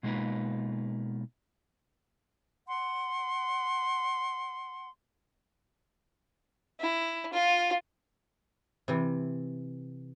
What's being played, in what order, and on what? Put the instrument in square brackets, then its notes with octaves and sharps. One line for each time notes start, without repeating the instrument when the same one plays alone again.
[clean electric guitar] B2 G#3 A#3 D#4 F4 B4
[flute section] F#5 C6
[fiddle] E4
F4
[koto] C3 E3